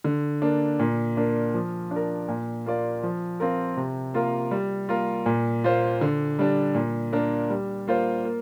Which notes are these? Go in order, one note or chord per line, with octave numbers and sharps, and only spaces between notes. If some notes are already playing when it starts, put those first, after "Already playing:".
D3
A#3 D4
A#2
A#3 D4
F3
D4
A#4
A#2
A#3 F4 D5
F3
C4 F4 A#4
C3
A#3 F4 A#4
G3
A#3 F4 A#4
A#2
A#3 F4 C5
D3
G3 D4
A#2
A#3 D4 A#4
G3
A#3 F4 C5
A#3